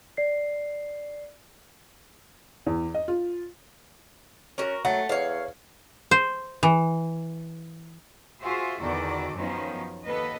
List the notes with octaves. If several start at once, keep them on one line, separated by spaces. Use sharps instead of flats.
D5 C7
E2
D#5
F4
C#4 F#4 A#4
F#3 A3 F#5
E2 C#5 F5
C5
E3
F4 F#4 G#4 C5 E5
E2 D3 D#3 F#4 A4 D5
F#2 D#3 F3 B3 C#4 D#4
D#2 B3 A4 B4 D#5